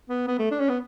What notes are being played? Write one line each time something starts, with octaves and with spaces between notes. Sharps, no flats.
B3
B3
A3
D4
C#4
B3